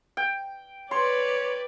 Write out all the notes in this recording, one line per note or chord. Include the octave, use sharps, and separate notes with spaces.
G5
B4 C#5 D5 C6